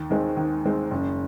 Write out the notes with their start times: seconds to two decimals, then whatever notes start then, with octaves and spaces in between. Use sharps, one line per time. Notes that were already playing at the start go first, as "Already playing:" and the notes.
Already playing: D#2
0.10 D#3 G#3 C4
0.37 D#2
0.65 D#3 G#3 C4
0.91 F#1